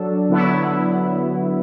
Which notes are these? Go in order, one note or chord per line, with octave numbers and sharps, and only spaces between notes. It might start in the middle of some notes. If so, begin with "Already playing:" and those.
Already playing: F#3 D4 A4
D3 F#3 B3 E4